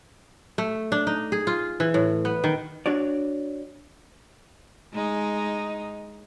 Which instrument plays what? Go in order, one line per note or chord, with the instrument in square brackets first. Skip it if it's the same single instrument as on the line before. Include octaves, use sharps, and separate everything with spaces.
[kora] A3
D4
D#4
G#4
F4
E3
A2
B3
D#3
[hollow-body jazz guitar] D4 F#4 C#5 D5
[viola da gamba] G#3 D#4